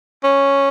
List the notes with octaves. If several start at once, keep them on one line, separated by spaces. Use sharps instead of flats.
C#4